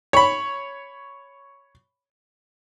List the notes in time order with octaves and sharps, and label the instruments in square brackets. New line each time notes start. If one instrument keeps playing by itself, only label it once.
[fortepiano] C#5 B5